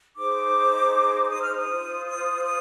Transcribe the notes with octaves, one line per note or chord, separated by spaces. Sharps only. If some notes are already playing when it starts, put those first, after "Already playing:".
D#4 G#4 C5 D6
D6
D#6
F6
D#6
F4 C5
D#6
D#6